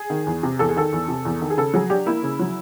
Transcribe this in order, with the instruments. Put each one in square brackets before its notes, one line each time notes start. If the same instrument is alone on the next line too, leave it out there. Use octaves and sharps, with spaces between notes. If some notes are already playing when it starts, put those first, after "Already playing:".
Already playing: [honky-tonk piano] G#4
D#3
E2
C3
E2 A4
G#4
D#3 A4
E2
C3
E2
D#3
G#4
C#3 A4
F#3 G#4
D4 G4
A#3 E4
C#3
F#3